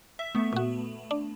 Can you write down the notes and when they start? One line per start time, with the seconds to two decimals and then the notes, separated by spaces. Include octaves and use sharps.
0.19 E5
0.35 A3 B3
0.53 A#2 F#4
1.11 D4